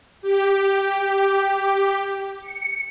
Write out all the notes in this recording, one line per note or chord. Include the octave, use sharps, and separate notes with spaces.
G4
C#7